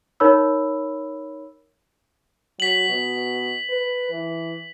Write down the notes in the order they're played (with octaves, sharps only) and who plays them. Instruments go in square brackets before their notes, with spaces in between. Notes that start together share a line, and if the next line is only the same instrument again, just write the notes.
[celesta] D#4 A#4 C#5 B5 E6
[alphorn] F#3 [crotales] B6 F#7
[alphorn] B2
B4
E3